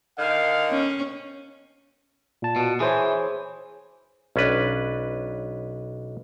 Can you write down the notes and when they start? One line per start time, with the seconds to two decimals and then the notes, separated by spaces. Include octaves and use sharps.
0.18 D3 D#3 F5
0.70 C#4
2.42 A#2 A5
2.56 B2
2.80 E3 G#4 C5 C#5
4.36 B1 C#4 D4 B4 D5